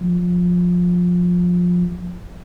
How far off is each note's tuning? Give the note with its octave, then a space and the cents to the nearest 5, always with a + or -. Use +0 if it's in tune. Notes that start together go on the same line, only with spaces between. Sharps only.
F3 +20